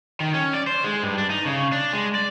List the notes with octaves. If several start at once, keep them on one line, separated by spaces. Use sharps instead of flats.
D#3
C#4
D5
C5
G#3
G2
D4
D#4
C#3
D4
G#3
D5